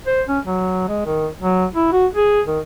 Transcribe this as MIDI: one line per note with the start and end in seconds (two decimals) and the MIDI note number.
0.07 0.22 72
0.28 0.39 61
0.45 0.87 54
0.88 1.05 56
1.06 1.28 51
1.41 1.66 54
1.75 1.90 64
1.92 2.07 66
2.15 2.41 68
2.47 2.60 51